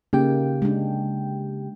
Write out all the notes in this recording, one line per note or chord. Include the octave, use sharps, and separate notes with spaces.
C#3 A#3 D#4 G4 G5
G#3 D4